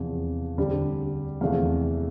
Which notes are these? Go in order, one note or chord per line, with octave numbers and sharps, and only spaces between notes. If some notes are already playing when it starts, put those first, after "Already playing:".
Already playing: E2 C3 F3
D2 D3 G3 C4
E2 C3 F3 A3 F5